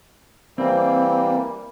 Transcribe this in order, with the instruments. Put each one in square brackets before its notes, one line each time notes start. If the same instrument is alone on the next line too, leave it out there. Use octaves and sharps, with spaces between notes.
[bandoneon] E3 G3 A#3 [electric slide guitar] C4